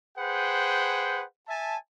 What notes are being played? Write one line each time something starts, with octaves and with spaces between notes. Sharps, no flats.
G#4 B4 C5 F#5 G5
E5 G#5 A5